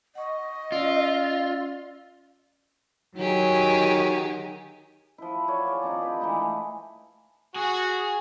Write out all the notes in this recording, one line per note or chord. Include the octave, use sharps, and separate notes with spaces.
D#5 F#5 C#6
C#4 F4 D5 E6
D#3 F#3 G4 G#4
F3 E4
F4 F#4 C#5 D5
F4 G#4 D5
F3 C4 D4 D#4
G4 B4
E3 G#3 A3 D#4
F#4 G#4 G#5